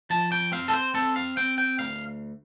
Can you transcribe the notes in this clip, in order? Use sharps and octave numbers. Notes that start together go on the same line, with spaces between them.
F3 A5
G5
C4 F5
A4
C5
C4 A4
F5
C4 G5
G5
D2 F5